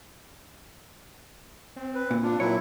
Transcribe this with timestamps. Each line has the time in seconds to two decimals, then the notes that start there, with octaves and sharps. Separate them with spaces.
1.76 C4
1.95 B4
2.11 A#2
2.23 D4 F4
2.40 A#2 F#3 E4 C#5